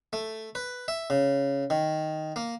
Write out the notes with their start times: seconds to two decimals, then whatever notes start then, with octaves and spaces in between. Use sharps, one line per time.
0.13 A3
0.55 B4
0.88 E5
1.10 C#3
1.70 D#3
2.36 A#3